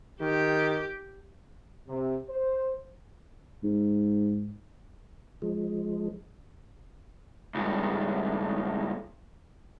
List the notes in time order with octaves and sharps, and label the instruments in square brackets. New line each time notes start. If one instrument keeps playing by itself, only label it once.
[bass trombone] D#3 [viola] G4
[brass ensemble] C3
C5
[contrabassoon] G#2
[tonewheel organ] F3 G#3
[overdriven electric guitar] C#2 G2